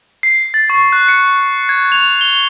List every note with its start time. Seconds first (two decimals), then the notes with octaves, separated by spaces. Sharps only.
0.23 C7
0.54 A6
0.70 C#6
0.92 F#6
1.08 C#7
1.69 G#6
1.92 F7
2.21 G7